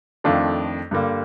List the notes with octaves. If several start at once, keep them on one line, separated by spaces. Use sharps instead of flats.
F2 D#3 A3 D4 F4
G2 D3 G3 A#3